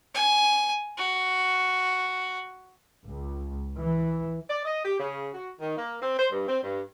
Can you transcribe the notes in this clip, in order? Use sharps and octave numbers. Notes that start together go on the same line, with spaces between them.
G#5
F#4
C#2
E3
D5
D#5
G4
C#3
F#4
D#3
A#3
C4
C5
G2
C4
G2